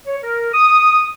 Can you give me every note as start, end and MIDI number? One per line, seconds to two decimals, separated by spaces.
0.06 0.16 73
0.23 0.52 70
0.54 1.08 87